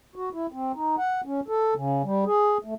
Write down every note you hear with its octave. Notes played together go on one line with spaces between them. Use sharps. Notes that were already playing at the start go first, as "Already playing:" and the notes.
F#4
E4
C4
D#4
F#5
C#4
A4
C#3
G3
G#4
A3